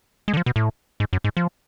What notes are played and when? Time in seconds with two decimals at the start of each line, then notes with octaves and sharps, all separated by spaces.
0.28 G#3
0.34 D3
0.37 F3
0.46 B2
0.56 A2
1.00 G#2
1.13 F#2
1.24 G#2
1.37 F3